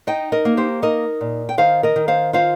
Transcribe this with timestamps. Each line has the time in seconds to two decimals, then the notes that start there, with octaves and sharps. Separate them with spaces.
0.07 D#4 D#5 G5
0.32 A#4 D#5
0.45 A#3
0.57 G4 C5
0.82 D#4 A#4 D#5
1.21 A#2
1.49 G5
1.58 D#3 C5 F5
1.83 A#4 D#5
1.96 D#3
2.08 C5 F5
2.33 F4 C5 F5